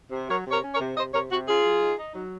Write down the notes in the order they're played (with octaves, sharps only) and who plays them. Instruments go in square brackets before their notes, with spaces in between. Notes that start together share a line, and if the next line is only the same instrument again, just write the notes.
[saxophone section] C3
F#3 A#4 C#5
C3
A#4 C#5
C#4
A#4 C#5
C3
C3 C5 D#5
C3 A#4 C#5
C3 F#4
C#4 F4 G#4
F#3
D#4
D#4
F#3